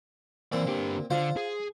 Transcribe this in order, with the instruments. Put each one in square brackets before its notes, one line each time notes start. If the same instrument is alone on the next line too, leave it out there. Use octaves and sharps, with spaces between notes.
[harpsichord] A#2 C4 [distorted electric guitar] E3 D5
[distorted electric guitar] D3 G4
[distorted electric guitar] D3 [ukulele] F4 [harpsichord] C5
[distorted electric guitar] G#4